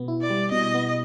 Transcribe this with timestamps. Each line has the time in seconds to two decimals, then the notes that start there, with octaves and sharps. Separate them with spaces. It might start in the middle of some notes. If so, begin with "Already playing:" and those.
Already playing: B2 B3
0.08 E4
0.22 D5
0.30 G3
0.52 B2 D#5
0.74 B3